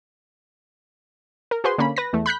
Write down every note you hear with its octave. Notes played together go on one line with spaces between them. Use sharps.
A#4
F#4 G#4 B4 C5 C6
D3 A#3 C#4 B5
B4 A#6
E2 A3
B5 F#6 G6 B6